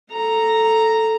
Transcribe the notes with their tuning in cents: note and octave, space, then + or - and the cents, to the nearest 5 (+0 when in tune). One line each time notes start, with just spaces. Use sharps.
A4 +0 A#5 -5